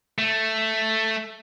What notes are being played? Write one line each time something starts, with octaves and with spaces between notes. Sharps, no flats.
A3